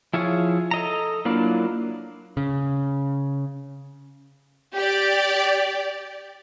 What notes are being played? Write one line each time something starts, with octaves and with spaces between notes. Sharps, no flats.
F3 E4 F4 G#4 C#5
A4 D#5 A#5
F#3 A#3 D4 E4 F4
C#3
G4 D5